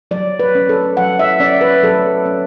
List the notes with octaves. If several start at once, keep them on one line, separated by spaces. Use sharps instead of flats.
F#3 D5
B4
C#4
A4
F#3 F#5
E5
C#4 D5
B4
F#3 A4
C#4